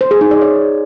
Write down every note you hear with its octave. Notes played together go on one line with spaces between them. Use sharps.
C5
G#4
D#4
D5
C#5